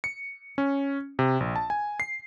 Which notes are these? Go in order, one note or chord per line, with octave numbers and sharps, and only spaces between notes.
C#7
C#4
C3
A#1
A5
G#5
C7